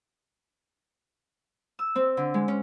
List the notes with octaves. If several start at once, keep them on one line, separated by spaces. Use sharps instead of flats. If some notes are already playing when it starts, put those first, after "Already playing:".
E6
C4
D3
G#3
C#4